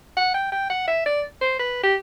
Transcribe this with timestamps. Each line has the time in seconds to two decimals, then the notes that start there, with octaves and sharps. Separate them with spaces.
0.17 F#5
0.34 G5
0.52 G5
0.70 F#5
0.88 E5
1.06 D5
1.41 C5
1.59 B4
1.83 G4